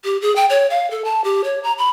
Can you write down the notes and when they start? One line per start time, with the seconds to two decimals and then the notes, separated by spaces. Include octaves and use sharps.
0.04 G4
0.22 G#4
0.36 G5
0.50 C#5
0.70 F5
0.91 A4
1.05 A5
1.24 G4
1.44 C#5
1.63 A#5
1.78 B5